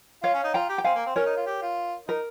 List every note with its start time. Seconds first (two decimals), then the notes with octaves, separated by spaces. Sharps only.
0.23 F4 C#5 F5
0.34 C#4
0.44 D#4
0.54 F4 G5 A#5
0.69 G4
0.78 G5
0.84 C4 F5 G#5
0.95 A#3
1.06 C4
1.16 C#4 A#4 C#5
1.26 D#4
1.37 F4
1.46 G4
1.62 F4
2.08 D#4 A#4